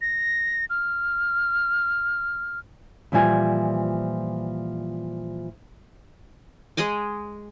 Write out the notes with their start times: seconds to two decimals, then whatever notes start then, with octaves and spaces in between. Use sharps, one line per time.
0.01 A#6
0.70 F6
3.12 A#2 E3 F3 G3 G#5
6.77 G#3 G#4 D#5 D6